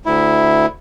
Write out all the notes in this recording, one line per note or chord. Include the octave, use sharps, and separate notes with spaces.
D2 E4